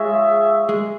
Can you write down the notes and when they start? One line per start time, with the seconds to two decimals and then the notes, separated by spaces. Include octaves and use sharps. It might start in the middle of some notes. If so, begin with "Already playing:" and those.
Already playing: G#3 F4 G#4 C#5 E5
0.69 G#3